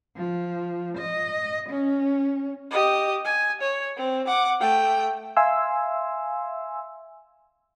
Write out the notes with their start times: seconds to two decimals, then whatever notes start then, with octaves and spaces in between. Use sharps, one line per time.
0.16 F3
0.98 D#5
1.69 C#4
2.71 G4 D#5
3.25 G#5
3.61 C#5
3.97 C4
4.27 F#5 D6
4.61 A3 G5
5.37 E5 F5 G#5 C6 E6